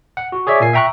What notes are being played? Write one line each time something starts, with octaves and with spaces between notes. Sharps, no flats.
F#5
F#4
G#4 C#5 D5 E5
A#2 A#3 G#5 C7
E5 G5 A#5 C#6 F#6